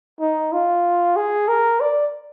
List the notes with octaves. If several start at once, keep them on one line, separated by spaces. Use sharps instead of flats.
D#4
F4
G#4
A#4
D5